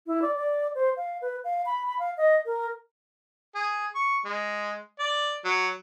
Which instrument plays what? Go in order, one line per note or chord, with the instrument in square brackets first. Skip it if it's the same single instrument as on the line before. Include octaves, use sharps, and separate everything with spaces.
[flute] E4
D5
D5
C5
F5
B4
F5
B5
B5
F5
D#5
A#4
[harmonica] G#4
C#6
G#3
D5
F#3